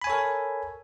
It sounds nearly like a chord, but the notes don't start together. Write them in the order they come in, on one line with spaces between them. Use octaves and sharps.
B5 G#5 C#5 A4 A#4